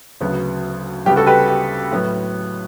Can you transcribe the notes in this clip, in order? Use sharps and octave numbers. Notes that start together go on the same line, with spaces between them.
D2 C#3 F#3 B3
D2 C#3 G3 B3 G4
F#4 A4
G4 B4
G4
A2 F#3 B3